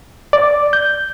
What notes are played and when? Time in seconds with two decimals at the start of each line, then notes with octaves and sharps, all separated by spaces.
0.33 D5
0.73 G6